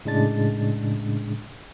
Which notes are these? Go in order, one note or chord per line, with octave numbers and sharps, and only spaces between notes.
A2 C#3 G#3 D4 A6